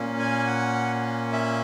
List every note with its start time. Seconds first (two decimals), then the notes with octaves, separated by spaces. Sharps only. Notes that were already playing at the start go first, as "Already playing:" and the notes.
Already playing: A#2 A#3 C#4
0.19 G#5
0.47 F#5
1.32 E5